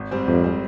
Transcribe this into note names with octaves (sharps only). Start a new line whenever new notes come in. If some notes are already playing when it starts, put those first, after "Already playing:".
Already playing: G#1
G#2 G3 C4
G#1 F2
G3 C4